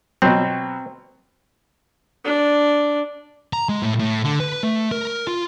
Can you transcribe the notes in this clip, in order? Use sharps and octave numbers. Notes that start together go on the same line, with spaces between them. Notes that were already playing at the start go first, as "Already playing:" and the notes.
B2 F#3 C4
D4
A#5
G#3
A2
A2
D3
B4
A3
A#4
F4